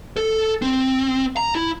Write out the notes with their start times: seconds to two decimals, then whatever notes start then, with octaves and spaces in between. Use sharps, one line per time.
0.16 A4
0.62 C4
1.37 A#5
1.55 E4